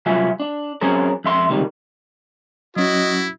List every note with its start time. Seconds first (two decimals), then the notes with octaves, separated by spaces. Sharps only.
0.06 C2 F#3 F4 E5 G#5
0.40 D4
0.81 F#3 C4 C#4 G#4 A#4
1.24 F2 E5 C6
1.49 C#2 C3 D#3 G3
2.76 F#3 C#4 E4 F#4 D#5